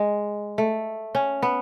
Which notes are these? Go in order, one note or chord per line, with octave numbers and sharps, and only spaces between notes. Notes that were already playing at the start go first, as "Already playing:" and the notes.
Already playing: G#3
A3
C#4
B3